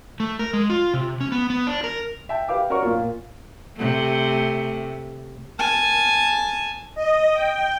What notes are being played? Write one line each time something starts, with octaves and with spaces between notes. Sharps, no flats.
A3
A#4
G#3
F4
C3
C#4
B3
B3
D4
A#4
E5 G5 A5
G4 B4 F5 G5 D6
C#4 F#4 A#4 D5 C#6
A#2 A#3 F4
C3 A3
G#5 A5
D#5
G5